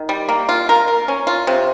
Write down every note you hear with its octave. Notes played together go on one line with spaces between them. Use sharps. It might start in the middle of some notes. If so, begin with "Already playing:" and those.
Already playing: D#3
G3
A#3
F4
A#4
A#4
C#4
F4
C3